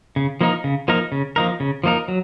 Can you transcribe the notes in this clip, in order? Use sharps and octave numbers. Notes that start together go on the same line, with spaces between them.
C#3
F3 A#3 D#4 A#4
C#3
F3 A#3 D#4 A#4
C#3
F3 A#3 D#4 A#4
C#3
F3 A#3 D#4 A#4
F#3